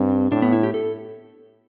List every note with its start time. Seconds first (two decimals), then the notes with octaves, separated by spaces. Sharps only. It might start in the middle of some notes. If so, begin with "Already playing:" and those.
Already playing: G2 C4
0.31 A2 D4
0.42 B3
0.53 E4
0.63 G4
0.74 A4